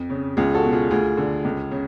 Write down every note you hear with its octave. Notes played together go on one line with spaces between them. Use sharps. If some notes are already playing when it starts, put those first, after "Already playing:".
Already playing: F2
C#3
C#2 F4 G#4
F#4 A4
B2
F4 G#4
D2 F4 G#4
D3
C#2
C#3